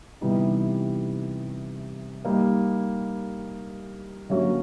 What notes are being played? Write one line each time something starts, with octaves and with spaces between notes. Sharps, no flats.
C3 E3 G3 B3 D#4
G3 A#3 D#4
D3 F#3 A#3 C#4 F#4